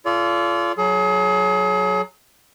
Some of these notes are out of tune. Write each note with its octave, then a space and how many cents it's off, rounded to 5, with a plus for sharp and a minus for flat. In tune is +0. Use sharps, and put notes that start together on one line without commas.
F4 -25 A4 -35 D5 -40
F#3 +0 G#4 +35